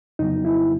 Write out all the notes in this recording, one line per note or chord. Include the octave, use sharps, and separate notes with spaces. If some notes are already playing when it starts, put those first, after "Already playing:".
F2 C#3 F#3 B3 D#4
E4